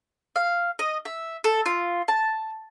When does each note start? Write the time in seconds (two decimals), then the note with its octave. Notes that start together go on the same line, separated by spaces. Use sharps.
0.36 F5
0.79 D#5
1.05 E5
1.44 A4
1.66 F4
2.08 A5